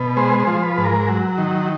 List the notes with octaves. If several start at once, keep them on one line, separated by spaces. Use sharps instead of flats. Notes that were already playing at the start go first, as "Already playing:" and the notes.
Already playing: B2
G#3 C5
C5
F3
B4
G#2
A#4
F#3
D#3